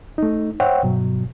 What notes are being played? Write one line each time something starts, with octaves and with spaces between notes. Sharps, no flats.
A3 D#4
C5 C#5 E5 F#5 G5
G2 B2 F#3